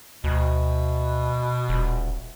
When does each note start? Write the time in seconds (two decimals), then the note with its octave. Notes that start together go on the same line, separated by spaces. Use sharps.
0.24 D2 B2
1.69 D#1